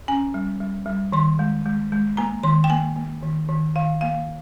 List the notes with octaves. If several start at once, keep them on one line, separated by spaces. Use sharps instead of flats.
C#4 G#5
G3
G3
G3
D#3 C6
G#3
G#3
G#3
A#3 A#5
D#3 C6
G5
A#3 G#5
A#3
D#3
D#3
D#3 F5
A#3 F5